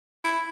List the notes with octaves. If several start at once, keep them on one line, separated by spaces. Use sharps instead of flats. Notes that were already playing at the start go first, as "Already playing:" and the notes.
E4